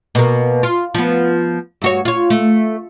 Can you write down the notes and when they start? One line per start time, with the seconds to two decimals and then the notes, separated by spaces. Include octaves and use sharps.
0.15 B2 A#3
0.63 F4
0.94 F3 B3
1.82 G2 F#4 C#5
2.05 F4 C#5
2.30 A3